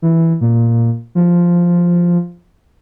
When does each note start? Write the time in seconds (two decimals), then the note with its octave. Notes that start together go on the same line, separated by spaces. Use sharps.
0.02 E3
0.41 A#2
1.15 F3